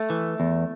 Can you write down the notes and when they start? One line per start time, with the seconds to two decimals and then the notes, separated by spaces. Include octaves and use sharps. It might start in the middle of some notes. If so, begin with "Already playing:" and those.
Already playing: A3
0.10 E3
0.40 E2